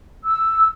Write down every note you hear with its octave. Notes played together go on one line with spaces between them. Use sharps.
E6